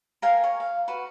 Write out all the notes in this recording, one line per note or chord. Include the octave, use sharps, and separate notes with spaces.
A#4 F5 G5 G#5
C#5
F5
F#4 B4